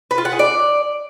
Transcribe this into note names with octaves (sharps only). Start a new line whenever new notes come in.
B4
F4
F#5
G#4
D5